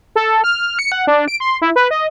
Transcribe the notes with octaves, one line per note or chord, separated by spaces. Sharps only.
A4
F6
C#7
F#5
D4
D7
C6
E4
B4
D#5